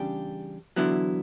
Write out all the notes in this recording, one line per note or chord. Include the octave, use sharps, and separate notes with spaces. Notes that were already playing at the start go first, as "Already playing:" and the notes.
Already playing: E2 C#3 G3 D4 G4
E2 D3 F#3 B3 E4